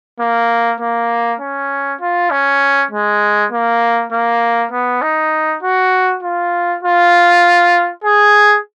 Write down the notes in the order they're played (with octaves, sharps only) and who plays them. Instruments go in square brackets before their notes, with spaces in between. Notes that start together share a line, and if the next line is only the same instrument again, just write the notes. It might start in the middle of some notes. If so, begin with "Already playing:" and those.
[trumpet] A#3
A#3
C#4
F4
C#4
G#3
A#3
A#3
B3
D#4
F#4
F4
F4
G#4